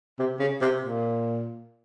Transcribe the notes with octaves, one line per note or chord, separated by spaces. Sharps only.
C3
C#3
C3
A#2